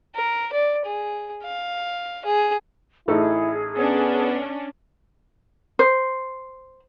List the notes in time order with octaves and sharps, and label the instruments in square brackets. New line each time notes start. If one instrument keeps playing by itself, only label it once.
[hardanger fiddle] A#4
D5
G#4
F5
G#4
[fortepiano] A1 D#4 A4 [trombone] E4 [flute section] G#4
[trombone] B3 [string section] C#4 D4
[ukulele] C5